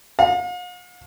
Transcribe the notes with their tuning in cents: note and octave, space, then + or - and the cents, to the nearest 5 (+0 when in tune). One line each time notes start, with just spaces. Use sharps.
F5 +45